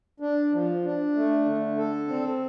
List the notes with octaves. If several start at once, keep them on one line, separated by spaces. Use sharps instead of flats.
D4
F3
D4
A3
D3
A4
C4